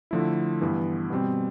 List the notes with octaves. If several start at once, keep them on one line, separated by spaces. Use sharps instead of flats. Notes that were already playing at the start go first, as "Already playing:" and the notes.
D3 F3 A3 E4
G2 E3 B3
B2 G3 C4